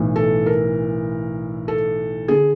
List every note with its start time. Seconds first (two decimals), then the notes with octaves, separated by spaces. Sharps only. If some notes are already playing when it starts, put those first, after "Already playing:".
Already playing: B1 A2 E3
0.16 A4
0.46 A#4
1.68 A4
2.28 D3 G#4